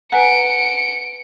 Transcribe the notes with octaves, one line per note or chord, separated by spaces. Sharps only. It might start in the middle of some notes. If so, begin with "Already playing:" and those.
B4 F#5 G#5 A#5 C#7 D7